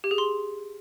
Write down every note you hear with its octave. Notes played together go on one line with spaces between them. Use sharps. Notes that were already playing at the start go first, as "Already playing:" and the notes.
G4
G#4
C6